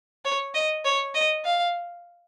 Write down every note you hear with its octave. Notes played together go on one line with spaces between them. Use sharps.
C#5
D#5
C#5
D#5
F5